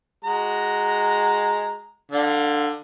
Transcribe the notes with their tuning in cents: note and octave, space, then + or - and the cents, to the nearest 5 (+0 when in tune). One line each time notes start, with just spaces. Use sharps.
G#3 +0 F#4 +0 A#5 +0
D3 +15 F5 +30